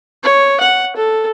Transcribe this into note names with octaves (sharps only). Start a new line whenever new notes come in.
C#5
F#5
A4